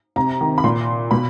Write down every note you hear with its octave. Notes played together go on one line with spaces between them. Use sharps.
C3 A#5
D#3
B5
A#2 C6
B2 B5